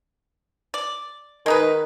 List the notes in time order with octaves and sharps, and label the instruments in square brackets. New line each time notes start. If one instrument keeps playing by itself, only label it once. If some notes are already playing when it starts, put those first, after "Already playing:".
[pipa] D5
[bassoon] D#3 [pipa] G#3 D#4 B4